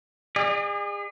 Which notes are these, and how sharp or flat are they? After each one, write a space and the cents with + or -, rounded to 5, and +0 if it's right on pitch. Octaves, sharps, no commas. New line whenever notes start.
G#4 -35 D5 +45